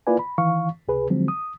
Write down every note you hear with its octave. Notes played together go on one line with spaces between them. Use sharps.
A#3 E4 F4 B4 D5 G#5
B5
D#3 E3 F5 C#6
C#2 C3 G#4 B4
D3 F3 F#3 G#3 C4
D#6